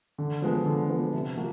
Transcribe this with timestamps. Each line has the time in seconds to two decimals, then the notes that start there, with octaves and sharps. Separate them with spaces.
0.18 D3
0.42 F3 G#3 B3
0.66 D3
0.89 F3 G#3 B3
1.13 C3
1.37 F3 A#3 F#4